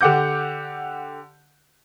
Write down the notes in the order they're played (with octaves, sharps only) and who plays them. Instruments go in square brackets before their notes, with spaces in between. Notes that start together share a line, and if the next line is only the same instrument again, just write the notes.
[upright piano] D3 G4 F#5 D6 G6